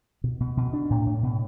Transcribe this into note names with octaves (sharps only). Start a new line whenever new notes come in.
B2
B2
B2
D4
A2
A2
B2